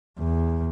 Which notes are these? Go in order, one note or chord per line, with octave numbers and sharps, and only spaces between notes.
E2